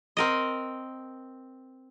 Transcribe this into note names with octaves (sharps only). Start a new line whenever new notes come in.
C4 A#4 D#5